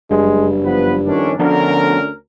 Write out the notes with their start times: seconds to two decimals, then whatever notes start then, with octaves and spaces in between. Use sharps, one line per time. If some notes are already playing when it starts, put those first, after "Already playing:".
0.11 F#1 G2 G#3
0.64 F3 B3 B4
1.07 F2 D#3 C#4 D4
1.39 D2 D3 F3 B3 C#4 D4 A#4